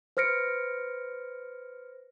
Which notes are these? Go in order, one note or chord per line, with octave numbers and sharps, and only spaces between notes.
B4 C5 F6 A#6 C#7 D7